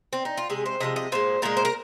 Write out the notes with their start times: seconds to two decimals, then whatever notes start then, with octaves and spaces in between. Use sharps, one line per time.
0.13 C4
0.25 D#4
0.37 F4
0.50 C3 G#3 G#4
0.66 C5
0.80 C3 F3 G#3 D#5
0.96 D#5
1.12 A#2 G#3 C5
1.42 A#2 G#3 A#4
1.57 C5
1.65 A#4